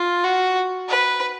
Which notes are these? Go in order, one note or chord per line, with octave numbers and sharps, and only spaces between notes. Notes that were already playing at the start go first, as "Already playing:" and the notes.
Already playing: F4
F#4
B4